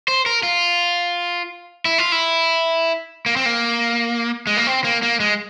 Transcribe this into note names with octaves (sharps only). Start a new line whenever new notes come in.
C5
A#4
F4
E4
F4
E4
A#3
C4
A#3
G#3
A#3
C4
A#3
A#3
G#3